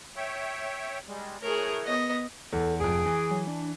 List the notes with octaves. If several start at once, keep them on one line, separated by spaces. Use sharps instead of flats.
C#5 E5 G5
G3 G#3
E3 A3 G#4 A#4 C#5
B3 D#5
E2 A4
F1 F2 G#4 D7
E3
F#3
D4